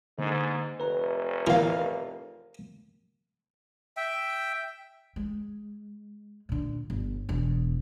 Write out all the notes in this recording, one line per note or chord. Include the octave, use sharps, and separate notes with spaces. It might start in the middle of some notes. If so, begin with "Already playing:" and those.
G#2 D3 A#3
F1 B4 A#5
E3 A#4 F5
E5 G5
G#3
A#2 D3
G1
E1 E2